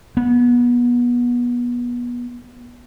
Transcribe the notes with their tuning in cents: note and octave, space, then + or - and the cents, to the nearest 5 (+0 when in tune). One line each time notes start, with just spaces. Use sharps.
B3 -25